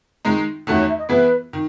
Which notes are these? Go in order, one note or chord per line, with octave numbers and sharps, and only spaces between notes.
D#3 G#3 D#4
E2 D#3 A3 C#4 F#4 A4
C#5
E5
D#5
E3 B3 E4 G#4 B4
D#3